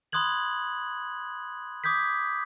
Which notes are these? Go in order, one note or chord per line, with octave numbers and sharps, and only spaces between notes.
B5 C6 D#6 F#6 G#6 F#7
D6 D#6 G6 G#6 B6